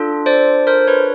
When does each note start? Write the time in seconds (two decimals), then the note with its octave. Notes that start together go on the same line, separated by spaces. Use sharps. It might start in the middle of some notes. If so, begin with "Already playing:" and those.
Already playing: D4 F4 A4
0.26 C5 D5
0.67 A#4 C5
0.87 B4 C#5